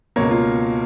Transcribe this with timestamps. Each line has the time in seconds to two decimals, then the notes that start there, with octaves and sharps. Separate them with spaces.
0.16 C#2 B2 A#3 C#5
0.31 F4